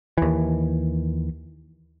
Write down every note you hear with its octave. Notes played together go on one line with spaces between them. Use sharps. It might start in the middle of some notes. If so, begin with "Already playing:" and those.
D#2 E3